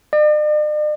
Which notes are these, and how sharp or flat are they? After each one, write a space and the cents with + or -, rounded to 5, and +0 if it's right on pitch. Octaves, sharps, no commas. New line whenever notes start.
D5 +45